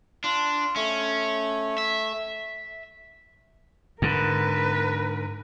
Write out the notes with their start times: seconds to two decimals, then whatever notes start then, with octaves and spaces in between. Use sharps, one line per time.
0.24 D4 F4
0.76 A3 C#4
1.78 E5
4.02 G#2 D3 A#4 B4